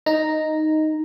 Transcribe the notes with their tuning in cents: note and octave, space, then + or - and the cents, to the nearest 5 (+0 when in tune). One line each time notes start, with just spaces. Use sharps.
D#4 +0 A#5 +0